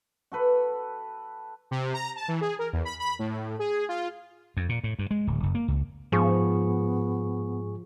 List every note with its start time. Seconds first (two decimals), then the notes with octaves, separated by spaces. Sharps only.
0.32 F#4 A4 B4
1.71 C3
1.94 A#5
2.16 A5
2.28 E3
2.41 G#4
2.59 A#4
2.73 E2
2.85 B5
3.00 B5
3.19 A2
3.59 G#4
3.89 F4
4.57 F2
4.69 A#2
4.84 A2
4.99 G2
5.11 G#3
5.27 D1
5.43 F#1
5.55 A#3
5.68 C#2
6.12 G#2 F3 B3 G#4 C#6